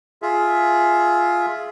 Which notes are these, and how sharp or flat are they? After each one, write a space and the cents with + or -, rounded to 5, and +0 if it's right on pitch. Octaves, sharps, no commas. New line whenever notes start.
F4 +0 G#4 +15 E5 +0